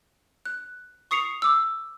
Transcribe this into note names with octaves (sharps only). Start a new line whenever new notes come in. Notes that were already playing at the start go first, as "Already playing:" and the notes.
F#6
C#6 D#6 C7 C#7 F7
D6 E6